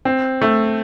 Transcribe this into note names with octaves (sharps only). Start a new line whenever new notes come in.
C4
A3